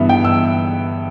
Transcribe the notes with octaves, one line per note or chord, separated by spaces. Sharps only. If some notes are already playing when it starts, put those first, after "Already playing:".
Already playing: G2 E3 B3 E5
G5
E6